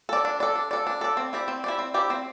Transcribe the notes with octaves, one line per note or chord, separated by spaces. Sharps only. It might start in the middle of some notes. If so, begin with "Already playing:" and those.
A4 D5
D4
A4 D5
D4
A4 D5
D4
A4 D5
C4
E4 G4 D5
C4
E4 G4 D5
C4
E4 G4 D5
C4